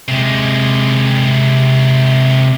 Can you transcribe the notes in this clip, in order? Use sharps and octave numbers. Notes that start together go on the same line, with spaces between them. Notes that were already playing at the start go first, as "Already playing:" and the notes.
C3 G#3